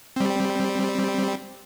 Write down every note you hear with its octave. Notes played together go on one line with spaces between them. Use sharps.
G3 C4